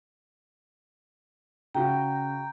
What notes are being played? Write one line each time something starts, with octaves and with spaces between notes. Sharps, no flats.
C#3 F#4 G5 A#5